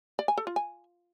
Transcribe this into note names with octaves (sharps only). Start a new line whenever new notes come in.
D5
G#5
A4
F4
G#5